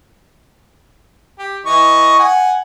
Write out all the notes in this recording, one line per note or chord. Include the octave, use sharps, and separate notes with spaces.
G4
E3 D#5 C#6
F#5 G#5